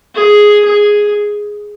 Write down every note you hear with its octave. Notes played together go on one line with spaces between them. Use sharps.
G#4
G#4